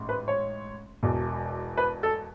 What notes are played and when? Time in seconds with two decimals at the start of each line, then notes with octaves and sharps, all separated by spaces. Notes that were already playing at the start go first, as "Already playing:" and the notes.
Already playing: A1 G#2
0.09 B4
0.28 C#5
1.03 E1 E2 B2
1.77 B4
2.03 A4